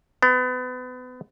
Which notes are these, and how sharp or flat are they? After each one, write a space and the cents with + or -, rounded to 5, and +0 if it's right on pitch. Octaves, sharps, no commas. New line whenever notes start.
B3 +30